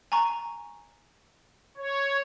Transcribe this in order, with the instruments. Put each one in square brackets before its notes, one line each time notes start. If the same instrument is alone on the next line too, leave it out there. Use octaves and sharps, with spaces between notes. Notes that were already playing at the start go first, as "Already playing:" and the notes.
[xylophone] G#5 A#5 C#6
[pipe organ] C#5